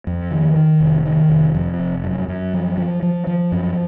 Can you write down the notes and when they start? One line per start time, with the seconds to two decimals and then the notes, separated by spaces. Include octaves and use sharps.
0.07 F2
0.31 D#3
0.56 D#3
0.80 F1
1.06 D#3
1.29 F1
1.55 F2
1.79 F1
2.04 F#2
2.28 F#2
2.54 F3
2.78 F3
3.02 F3
3.27 F3
3.52 F#2